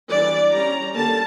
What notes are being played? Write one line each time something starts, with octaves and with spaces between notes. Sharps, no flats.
E3 G3 D4 D5
G3 C#4 A#5
D3 G3 A#3 A5